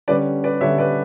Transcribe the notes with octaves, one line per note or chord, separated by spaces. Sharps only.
D3 G3 C#4 B4 D5
B4 D5
D3 G3 C#4 C#5 E5
B4 D5